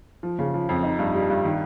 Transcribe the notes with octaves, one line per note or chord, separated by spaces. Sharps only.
F3
C#3
F3
F2
D#4
G2
G3
G2
D#3